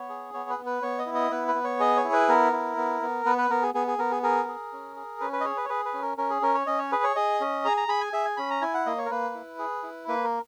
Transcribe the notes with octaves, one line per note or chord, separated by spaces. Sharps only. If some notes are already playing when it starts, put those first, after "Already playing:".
Already playing: B3 C#5
G#4
B3 C#5
B4
B3
B4
B3 C#5
D#5
E4
D#5
B3 B4
B4
B3
C#5
G#4 D#5
C#5
E4
B4
B3 A#4
E4
B3
B3
B3 B4
B4
B3 A#4
G#4
B3 G#4
G#4
B3 A#4
G#4
G#4 A#4
G#4
C#4
G#4
C#4 B4
B4
D#5
G#4 C#5
B4
C#5
G#4 B4
B4
C#4
A#4
C#4 A#4
G#4
C#4 A#4
C#5
C#4 D#5
C#5
G#4 B4
C#5
G#4 D#5
C#4
G#4 A#5
A#5
G#4 B5
G#5
G#4 E5
G#5
C#4 B5
A#5
E4 G#5
F#5
A#3 D#5
C#5
A#4
A#3 B4
E4
G#4
E4
A#3 B4
A#4